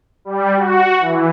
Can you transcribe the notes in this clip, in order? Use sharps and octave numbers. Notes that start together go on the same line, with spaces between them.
G3
F#4
E3